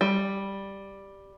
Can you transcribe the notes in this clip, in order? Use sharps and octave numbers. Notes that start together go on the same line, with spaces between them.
G3